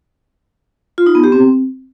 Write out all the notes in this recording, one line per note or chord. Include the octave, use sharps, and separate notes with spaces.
F4
D#4
B3
G4
C4